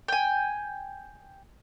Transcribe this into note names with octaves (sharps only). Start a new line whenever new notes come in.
G5 G#5